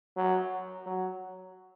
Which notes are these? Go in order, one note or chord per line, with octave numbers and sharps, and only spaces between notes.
F#3
F#3